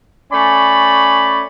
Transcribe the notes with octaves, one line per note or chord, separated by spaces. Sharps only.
A3 C#4 D5 G#5 B5